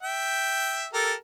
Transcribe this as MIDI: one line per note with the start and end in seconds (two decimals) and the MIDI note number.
0.03 0.86 76
0.03 0.86 79
0.93 1.14 67
0.93 1.14 69
0.93 1.14 70